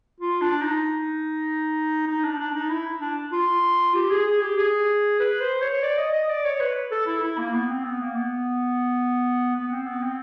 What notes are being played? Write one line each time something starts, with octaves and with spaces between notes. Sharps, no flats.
F4
D4
D#4
D#4
D4
D4
D#4
E4
D4
F4
G4
G#4
G#4
G4
G#4
B4
C5
C#5
D5
D#5
D#5
D5
C#5
B4
A4
E4
E4
A#3
B3
C4
B3
A#3
B3
B3
C4
B3
C4